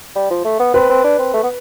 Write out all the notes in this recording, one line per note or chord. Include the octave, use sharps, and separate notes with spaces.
G3
F3
A3
B3
C4 B4
C4
D4
C4
A3
B3